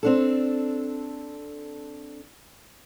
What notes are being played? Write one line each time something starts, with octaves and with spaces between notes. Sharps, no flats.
C4 D4 A4